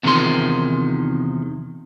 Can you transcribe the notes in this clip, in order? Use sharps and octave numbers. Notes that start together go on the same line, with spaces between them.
E2 C3 D#3 F3 G#4 C6